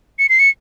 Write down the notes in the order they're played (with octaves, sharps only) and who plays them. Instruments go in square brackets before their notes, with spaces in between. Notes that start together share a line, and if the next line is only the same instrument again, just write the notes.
[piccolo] C#7
C7
C#7